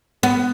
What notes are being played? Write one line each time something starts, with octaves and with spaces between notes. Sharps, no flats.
B3